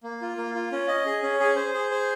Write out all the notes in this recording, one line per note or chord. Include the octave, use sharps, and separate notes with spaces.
A#3
F4
A#3
F4
C#4
D#5
G#4
C#4
G#4
C5
G#4
C5